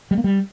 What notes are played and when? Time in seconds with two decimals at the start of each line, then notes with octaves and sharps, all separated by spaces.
0.11 G3
0.18 A#3
0.24 G3